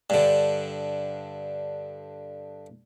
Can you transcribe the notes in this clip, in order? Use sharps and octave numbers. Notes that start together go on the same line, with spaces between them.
G2 D3